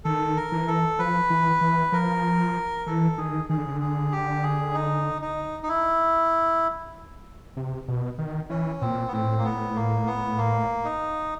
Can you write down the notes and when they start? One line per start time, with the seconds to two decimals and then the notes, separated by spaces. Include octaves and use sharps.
0.05 D#3 A4
0.37 A#4
0.52 E3
0.68 A4
0.99 F3 B4
1.30 E3
1.61 E3
1.92 F3 A#4
2.86 E3 A4
3.18 D#3 G#4
3.49 D#3 G#4
3.57 D3
3.65 C#3
3.73 D3
3.81 G#4
4.12 G4
4.43 G#4
4.74 D#4
5.22 D#4
5.63 D#4
5.69 E4
7.57 C3
7.88 B2
8.18 D#3
8.50 E3 C#4
8.81 A#2 C4
9.08 B3
9.12 A2 C4
9.38 A#3
9.44 B3
9.76 A#3
10.07 B3
10.38 A#3
10.85 D#4